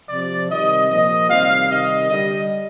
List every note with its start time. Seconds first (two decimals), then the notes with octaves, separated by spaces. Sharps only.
0.09 C3 F3 D5
0.49 C3 D#3 G3 D#5
0.89 A#2 F3 D#5
1.29 C3 D#3 G3 F5
1.69 C3 D#3 G3 D#5
2.09 D3 G3 D#5